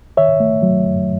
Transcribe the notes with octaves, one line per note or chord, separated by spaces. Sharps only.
D#3 C#5 E5
A3
F#3
F#2